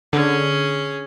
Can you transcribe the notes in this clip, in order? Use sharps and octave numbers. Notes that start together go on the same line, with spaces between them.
D3 C#4 G#4